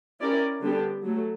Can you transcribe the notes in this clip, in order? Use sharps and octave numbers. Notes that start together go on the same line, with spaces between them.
C#4 E4 G4 A#4 D5
D3 G3 B3 D4 G4
F#3 A3